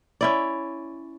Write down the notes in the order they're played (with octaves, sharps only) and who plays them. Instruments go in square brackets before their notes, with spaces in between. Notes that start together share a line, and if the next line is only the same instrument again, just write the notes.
[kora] C#4 E4 D5